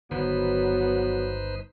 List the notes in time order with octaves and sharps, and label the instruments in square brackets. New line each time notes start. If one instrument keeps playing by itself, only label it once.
[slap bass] G1 D3 D#3 [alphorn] F#3 [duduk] B3 [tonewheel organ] D#4 B4 C5